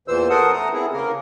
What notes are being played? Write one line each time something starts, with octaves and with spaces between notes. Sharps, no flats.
E2 A#2 E3 C5 E6
A4 A#4 C5 F#5 D#6
A3 A#5 D#6
B3 C4 E4 G#4
C#3 A#3 A#4